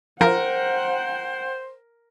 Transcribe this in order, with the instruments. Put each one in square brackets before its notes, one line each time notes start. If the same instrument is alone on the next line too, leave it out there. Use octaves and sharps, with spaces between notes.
[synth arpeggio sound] F3 [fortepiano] A#4 [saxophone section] C5 [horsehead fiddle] F#5 G5